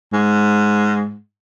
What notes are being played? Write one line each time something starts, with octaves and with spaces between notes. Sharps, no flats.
G#2